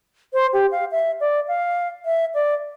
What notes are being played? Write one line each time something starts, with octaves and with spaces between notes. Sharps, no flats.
C5
G4
F5
E5
D5
F5
E5
D5